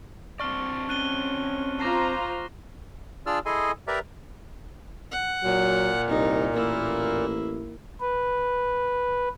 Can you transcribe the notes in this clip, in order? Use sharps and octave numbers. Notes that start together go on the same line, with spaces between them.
C4 D4 D5 C#6 F6
C#4 F#6 D#7 G7
F4 C5 A#5 D6 A#6 C7
D4 F4 G#4 D5 E6 F6
E4 G#4 A4 D#5 G#5 C6
G4 A#4 B4 D5 E5 A#5
F#5
A#2 F#3
C2 D#4
A1 A#3 E4
B4